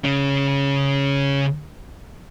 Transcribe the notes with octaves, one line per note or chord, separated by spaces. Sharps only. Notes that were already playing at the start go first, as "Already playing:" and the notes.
C#3 C#4